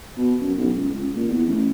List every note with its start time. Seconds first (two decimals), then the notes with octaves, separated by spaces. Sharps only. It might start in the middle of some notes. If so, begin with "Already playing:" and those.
0.17 B2
0.41 F#2
0.58 B1
0.75 C#2
0.93 C#2
1.16 A#2
1.28 E2
1.47 A1